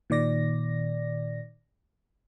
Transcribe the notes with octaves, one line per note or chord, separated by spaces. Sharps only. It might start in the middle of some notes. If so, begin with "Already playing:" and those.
A#2 D#3 D5 A#6